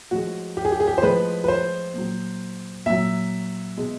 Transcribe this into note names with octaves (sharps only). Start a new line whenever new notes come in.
A2 F3 G#3 F#4
G4
G#4
G4
G#4
G4
C5
A2 F3 G#3 B4
B4
C5
A#2 F#3
A#2 F#3 E5
B2 G#3